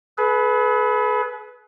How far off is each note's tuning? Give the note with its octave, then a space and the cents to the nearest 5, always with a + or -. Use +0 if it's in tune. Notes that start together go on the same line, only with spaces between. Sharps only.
G#4 +45 B4 +0